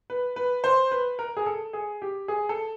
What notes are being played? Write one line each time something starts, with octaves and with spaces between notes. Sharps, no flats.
B4
B4
C5
B4
A#4
G#4
A4
G#4
G4
G#4
A4